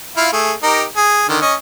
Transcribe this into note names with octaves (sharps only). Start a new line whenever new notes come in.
E4 F4 F5
A3 G#4
D#4 G4 A#4
G#4
D3 D#3
C#4 D#5